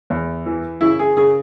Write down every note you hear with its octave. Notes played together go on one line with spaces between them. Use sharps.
E2
E3
C#3 E4
G#4
C#3 G#4